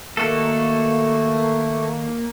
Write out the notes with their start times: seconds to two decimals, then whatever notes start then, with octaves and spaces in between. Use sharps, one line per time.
0.17 D#3 A3 A#3 F#4 A4